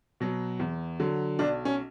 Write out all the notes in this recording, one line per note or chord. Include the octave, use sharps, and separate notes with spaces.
B2 F#3
E2
D3 F#3
B1 D4
C#4